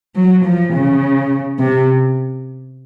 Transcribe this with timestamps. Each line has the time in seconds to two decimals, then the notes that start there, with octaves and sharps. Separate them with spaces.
0.16 F#3
0.45 F3
0.73 C#3
1.59 C3